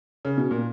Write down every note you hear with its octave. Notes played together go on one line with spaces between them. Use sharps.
C#3
B2
A#2